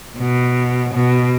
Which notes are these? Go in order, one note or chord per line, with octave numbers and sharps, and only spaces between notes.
B2
B2